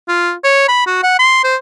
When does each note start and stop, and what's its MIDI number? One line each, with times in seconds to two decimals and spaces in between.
0.08 0.32 65
0.44 0.65 73
0.68 0.85 83
0.87 1.03 66
1.03 1.16 78
1.19 1.42 84
1.44 1.56 72